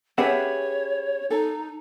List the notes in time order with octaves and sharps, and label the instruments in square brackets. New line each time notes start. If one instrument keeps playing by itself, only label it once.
[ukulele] C#4 G4 B4 [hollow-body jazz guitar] G#4 E5 F#5 [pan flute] C#5
[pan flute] D#4 [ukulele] A4